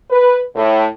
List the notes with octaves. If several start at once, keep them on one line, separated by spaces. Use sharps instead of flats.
B4
A2